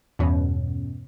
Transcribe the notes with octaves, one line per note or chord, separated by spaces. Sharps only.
E2 G2 B2 C#4